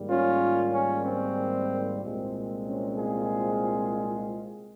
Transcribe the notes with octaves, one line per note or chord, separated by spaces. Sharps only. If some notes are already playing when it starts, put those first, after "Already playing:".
Already playing: G#2 D#3 G3 A#3
C#4 F4
C#4
C4
C2 A#2 G#3 C4
C#4
F4 G#4